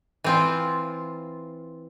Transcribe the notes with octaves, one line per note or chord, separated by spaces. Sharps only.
E3 C4 F4